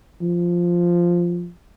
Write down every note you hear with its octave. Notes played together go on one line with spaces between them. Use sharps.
F3